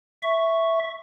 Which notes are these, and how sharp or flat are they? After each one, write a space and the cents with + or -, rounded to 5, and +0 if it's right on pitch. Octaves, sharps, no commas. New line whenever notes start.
E5 +0 C#6 +0